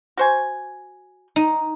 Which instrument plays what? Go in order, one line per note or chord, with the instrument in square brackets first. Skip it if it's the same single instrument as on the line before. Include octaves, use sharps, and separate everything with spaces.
[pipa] F#4 C5 G#5
[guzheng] D#4